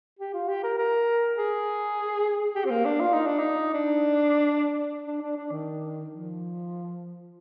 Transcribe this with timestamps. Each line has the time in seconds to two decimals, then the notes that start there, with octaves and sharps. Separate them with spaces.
0.19 G4
0.34 F4
0.49 G4
0.64 A#4
0.78 A#4
1.38 G#4
2.55 G4
2.65 C4
2.71 A#3
2.85 D4
3.00 F4
3.13 D#4
3.27 D4
3.39 D#4
3.74 D4
5.07 D4
5.22 D4
5.37 D4
5.52 D#3
6.10 F3